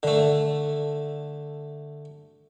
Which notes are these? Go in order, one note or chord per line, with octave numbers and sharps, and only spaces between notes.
D3 A3